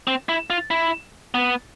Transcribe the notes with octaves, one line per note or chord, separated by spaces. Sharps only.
C4
E4
F4
E4
B3